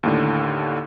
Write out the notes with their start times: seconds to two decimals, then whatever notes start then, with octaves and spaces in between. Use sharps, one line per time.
0.03 D#2 A2 D3